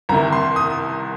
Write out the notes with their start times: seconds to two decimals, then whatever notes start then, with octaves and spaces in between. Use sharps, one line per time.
0.09 C2 A#5
0.12 C3 D#3
0.32 C6
0.56 D#6